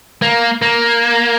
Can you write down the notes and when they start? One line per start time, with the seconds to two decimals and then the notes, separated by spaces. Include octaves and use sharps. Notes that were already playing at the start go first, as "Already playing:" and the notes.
0.22 A#3
0.62 A#3